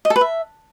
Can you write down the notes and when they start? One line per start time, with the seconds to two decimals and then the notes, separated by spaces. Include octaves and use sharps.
0.05 D#5
0.10 A4
0.16 B4
0.21 E5